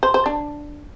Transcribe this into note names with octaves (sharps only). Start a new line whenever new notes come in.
C5
C5
D4